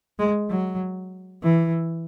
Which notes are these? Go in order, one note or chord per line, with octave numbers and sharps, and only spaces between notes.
G#3
F#3
E3